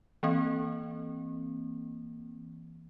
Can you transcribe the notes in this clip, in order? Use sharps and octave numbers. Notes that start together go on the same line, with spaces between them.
E3 A#3 C4